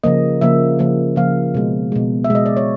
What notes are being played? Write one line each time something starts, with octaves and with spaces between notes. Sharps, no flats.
C#3 F3 A#3 D#5
C#3 F3 A#3 E5
C#3 F3 A#3
C#3 F3 A#3 F5
B2 G#3
B2 G#3
E5
B2 G#3 D#5
D5
C#5